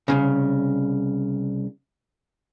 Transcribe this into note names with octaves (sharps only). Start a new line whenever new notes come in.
C2 F#2 C#3